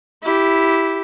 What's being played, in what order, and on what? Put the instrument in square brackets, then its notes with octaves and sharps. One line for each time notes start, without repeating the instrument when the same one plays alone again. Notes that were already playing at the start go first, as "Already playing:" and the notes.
[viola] E4 G4